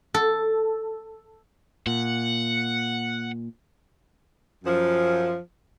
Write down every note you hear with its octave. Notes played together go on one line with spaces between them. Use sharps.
A4
A#2 F#5
F#2 F3